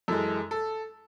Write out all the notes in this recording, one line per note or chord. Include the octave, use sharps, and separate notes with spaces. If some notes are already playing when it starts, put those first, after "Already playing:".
F#2 E3 G#3 A4
A4